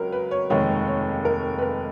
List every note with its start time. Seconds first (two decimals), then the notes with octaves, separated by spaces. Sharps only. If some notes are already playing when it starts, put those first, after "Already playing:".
Already playing: C#2 F#3 A#4
0.12 B4
0.31 C#5
0.50 F1 D#2 D#3 G#3 C#5
0.88 C#5
1.25 A#4
1.58 B4
1.62 A#4